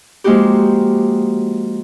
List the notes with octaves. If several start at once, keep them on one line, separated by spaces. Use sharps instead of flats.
F3 G#3 A#3 D#4 F#4 G4